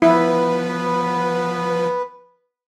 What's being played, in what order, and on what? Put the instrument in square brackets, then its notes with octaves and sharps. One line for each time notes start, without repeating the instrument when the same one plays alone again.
[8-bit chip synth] F3 B4 [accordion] B3 [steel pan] E4